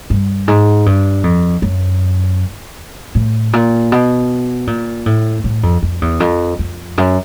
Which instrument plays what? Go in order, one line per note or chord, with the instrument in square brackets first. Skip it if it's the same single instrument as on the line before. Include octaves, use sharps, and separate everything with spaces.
[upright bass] G2
G#2
G2
F2
F#2
A2
A#2
B2
A#2
A2
A2
F2
F2
E2
F2
F2
F#2